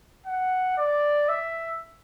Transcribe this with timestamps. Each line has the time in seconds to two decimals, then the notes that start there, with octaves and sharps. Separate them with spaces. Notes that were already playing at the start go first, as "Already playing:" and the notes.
0.26 F#5
0.77 D5
1.28 E5